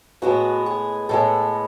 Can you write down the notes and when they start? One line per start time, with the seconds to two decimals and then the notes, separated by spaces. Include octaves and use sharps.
0.22 A2 G#3 B3 F#4
0.66 G#4
1.09 A2 G#3 B3 A4